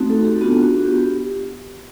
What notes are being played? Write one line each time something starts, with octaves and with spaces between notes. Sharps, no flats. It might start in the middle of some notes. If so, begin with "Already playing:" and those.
Already playing: A3 C4 D#4 F#4
A4
G4
B3 D4 F4 F#4
F#4
G4